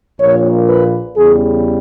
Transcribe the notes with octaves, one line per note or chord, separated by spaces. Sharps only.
A#1 A#2 A#3 C#5
B4
E2 C#3 G3 G#4